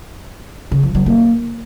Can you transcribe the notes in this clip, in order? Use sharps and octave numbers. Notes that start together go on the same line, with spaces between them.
C#3
F3
F#3
A#3